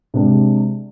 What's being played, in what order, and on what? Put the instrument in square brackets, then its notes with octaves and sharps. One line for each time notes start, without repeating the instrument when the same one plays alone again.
[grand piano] C3 G#3 D4